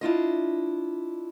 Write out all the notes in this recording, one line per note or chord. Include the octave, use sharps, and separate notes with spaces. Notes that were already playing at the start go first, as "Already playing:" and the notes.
D4 E4 F4 D#5